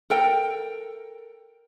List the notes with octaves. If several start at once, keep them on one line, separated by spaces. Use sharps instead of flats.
A4 A#4 G5